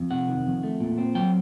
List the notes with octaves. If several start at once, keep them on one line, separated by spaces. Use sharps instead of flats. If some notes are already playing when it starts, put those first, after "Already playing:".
Already playing: F2
C3 F#5
D#3
F2
A3
A#2
C4
F#3 G5